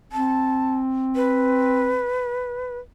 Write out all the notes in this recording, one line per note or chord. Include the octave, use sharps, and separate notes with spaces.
C4 A5
B4